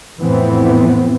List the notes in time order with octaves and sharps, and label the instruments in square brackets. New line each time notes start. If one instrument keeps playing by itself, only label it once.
[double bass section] F2 A2 E3 B3 C4